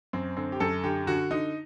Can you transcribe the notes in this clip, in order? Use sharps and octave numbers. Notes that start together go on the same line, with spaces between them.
F#2 C4
D3 C4
G4
F#2 A4
D3 G4
D3 F#4
D3 D#4